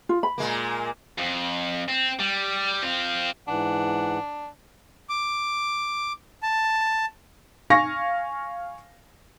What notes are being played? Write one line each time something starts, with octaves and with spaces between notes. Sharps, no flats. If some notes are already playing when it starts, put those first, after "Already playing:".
F4
B5
A#2 G#3 A#3
F2
C4
G3
C4 F4
G#2 E3 D4 F#5
D6
A5
F5 G#5 C#6 A#6